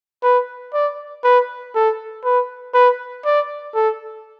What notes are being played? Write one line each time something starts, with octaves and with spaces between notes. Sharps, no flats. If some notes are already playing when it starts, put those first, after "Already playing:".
B4
D5
B4
A4
B4
B4
D5
A4